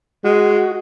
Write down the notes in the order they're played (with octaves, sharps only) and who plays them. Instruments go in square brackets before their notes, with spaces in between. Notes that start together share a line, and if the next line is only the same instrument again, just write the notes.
[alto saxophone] G#3 [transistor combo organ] F#4